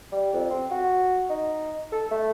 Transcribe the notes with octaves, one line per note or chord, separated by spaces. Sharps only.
G3
F2
C4
F#4
D#4
A4
A3